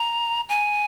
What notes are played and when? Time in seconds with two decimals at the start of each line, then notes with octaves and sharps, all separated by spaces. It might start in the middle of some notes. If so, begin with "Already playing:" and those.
Already playing: A#5
0.49 G#5